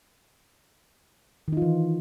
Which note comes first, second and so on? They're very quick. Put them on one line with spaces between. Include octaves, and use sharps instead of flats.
D#3 D#4 F4 E3